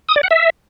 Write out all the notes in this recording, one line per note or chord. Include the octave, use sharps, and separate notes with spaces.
D#6
D5
F#5
E5